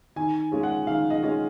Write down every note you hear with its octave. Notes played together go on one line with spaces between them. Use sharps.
D#3 G#5
G#3 C#4 F4
F#5
D#3 F5
D#5
G#3 C#4 F4 D#5